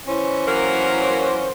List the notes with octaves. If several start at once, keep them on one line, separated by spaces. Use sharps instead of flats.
E3 C#4 C5
F#3 A#3 A#4